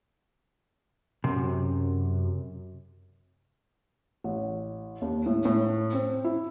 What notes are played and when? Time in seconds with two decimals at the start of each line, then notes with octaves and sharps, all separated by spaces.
1.24 F#2 C3
4.24 A1
5.02 D#2
5.26 A2
5.45 A2
5.93 C4
6.24 E4